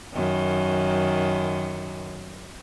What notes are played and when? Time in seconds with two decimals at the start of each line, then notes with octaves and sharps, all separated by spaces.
0.14 F#2 D#3